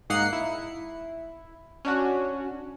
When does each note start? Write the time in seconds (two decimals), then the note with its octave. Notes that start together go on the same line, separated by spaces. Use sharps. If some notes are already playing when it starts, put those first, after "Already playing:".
0.10 G#2 A#3 D#4 F#5 C7 C#7
0.33 E4
1.85 C#4 D4 F#4